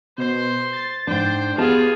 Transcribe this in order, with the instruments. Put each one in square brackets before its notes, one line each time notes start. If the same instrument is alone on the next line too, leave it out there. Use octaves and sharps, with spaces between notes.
[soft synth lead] B2 [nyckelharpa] C5 C6
[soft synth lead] A6
[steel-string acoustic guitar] G#2 D4 [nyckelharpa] C5 G5
[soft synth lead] B3 [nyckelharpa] F4 G#4 [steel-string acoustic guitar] G4 D#5 A5